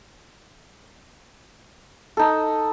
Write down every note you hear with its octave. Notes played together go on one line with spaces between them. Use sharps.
D#4 A4